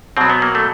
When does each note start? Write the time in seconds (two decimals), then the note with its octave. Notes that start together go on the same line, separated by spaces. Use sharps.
0.17 B2 F#3 C4
0.30 B3
0.42 A#3
0.55 A3